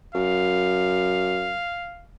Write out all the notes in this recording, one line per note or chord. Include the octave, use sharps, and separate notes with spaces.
F#2 F5